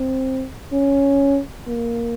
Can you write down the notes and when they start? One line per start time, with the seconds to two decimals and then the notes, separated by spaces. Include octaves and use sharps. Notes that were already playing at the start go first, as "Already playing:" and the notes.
Already playing: C4
0.73 C#4
1.67 A#3